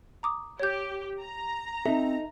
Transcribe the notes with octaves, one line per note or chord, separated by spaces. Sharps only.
A#5 D6 D#6
G4 C#5 G6
A#5
C4 D#4 A4 E5